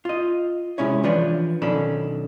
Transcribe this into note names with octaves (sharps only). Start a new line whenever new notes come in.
F4 D#5
C3 G#3 C#4 E4 C#5
E3 F3 D4 B4 C#5
B1 D#3 C#4 D4 A4 B5